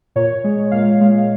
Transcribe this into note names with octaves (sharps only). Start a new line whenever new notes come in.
A#2 C#5
G#3
A#2 F5
G#3